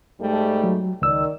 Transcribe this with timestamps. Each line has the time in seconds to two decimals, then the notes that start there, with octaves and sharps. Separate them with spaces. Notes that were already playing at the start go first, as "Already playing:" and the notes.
0.20 G#2 G3 A3
0.64 F#3
1.02 C#2 D#3 D5 E6